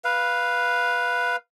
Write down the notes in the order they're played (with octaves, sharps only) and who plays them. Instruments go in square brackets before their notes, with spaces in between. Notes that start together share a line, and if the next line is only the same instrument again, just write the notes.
[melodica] B4 F5